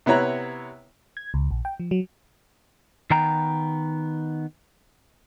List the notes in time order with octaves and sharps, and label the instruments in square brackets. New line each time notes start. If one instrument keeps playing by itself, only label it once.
[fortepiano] C3 B3 E4 C#5 A#5 F#6
[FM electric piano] G#6
C#2
A#1
G5
F3
F#3
[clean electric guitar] D#3 B3 G5 A#5